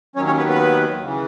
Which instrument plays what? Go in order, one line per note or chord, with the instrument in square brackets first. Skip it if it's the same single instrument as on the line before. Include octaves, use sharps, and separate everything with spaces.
[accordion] D#2 D#3 F#3 C#4 C#5
C#4 C#5
B3 B4
B3 B4
C#3 E3